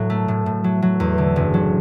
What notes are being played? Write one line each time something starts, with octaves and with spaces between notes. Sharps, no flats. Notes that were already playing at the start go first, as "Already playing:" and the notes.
Already playing: A2 F#3
A3
A2
A2
F#3
F#3
E2
D3
F#1
F#3